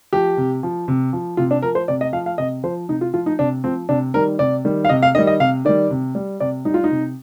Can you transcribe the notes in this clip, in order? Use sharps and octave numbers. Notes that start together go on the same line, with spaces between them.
F3 G4
C3
F3
C3
F3
C3 F4
D4
F3 A#4
C5
C3 D5
D#5
F3 F5
F5
C3 D#5
F3 C5
C3 D#4
F4
F3 F4
D#4
C3 D4
F3 C4
C3 D4
D#3 G3 A#4
C3 D5
D#3 G3
F5
C3 D#5
F5
D#3 G3 D#5
D#5
C3 F5
D#3 G3 D5
C3
G3
C3 D5
G3 D#4
F4
D#4
C3